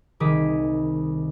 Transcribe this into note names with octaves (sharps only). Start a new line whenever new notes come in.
C2 D#3 G#4 D6 B6